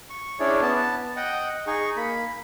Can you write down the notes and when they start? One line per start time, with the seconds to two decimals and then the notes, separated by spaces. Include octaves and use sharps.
0.10 C#6
0.40 C#4 D4 E4 G#4 C#5 D5
0.62 B3 A5
1.16 D#5 F#5 G5
1.67 D#4 G#4 C#6
1.96 A#3 B5